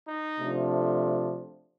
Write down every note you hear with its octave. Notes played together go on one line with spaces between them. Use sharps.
D#4
C3 F3 A3 D4